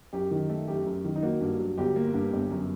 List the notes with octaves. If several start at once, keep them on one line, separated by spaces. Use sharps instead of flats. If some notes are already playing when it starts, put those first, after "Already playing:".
F#2 G4
D#3
A3
F#2 G4
F#2
D#3
D#4
A#3 F#4
G2
F#3
G1 G4
A#3
G2
G1
F#2